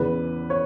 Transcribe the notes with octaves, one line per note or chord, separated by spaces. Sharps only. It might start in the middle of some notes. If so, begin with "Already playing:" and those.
Already playing: E2 C#3 E3 B4
C#5